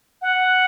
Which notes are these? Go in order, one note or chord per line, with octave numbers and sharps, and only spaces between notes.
F#5